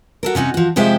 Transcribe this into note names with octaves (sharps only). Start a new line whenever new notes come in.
F#4 A4 A#4
C3 C#4 D#4 F#4
F3 F#4
C3 F3 G#3 G4 C5 E5